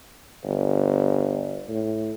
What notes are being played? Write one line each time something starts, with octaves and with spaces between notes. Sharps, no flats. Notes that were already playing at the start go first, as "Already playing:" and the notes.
G1
A2